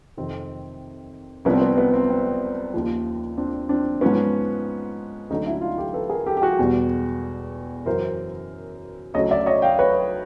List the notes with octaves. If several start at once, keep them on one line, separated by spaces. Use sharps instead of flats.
F2 C3 D#3 C4
C2 C3 F3 B3 C#4
C4
B3
B3
C4
C4
D#2 C#3 F3
C4 D4
C4 D4
G#2 F3 B3 C#4
D2 D3 F#3 C#4 D#4
D4 E4
D#4 F4
G4 A4
A4 B4
G#4 A#4
G4 A4
G4
F#4 G#4
E2 B2 G3
F#2 C#3 E3 A#4 C5
D2 C#3 F#3 C#5 D#5
D5 E5
C#5 D#5
F5 G5
B4 C#5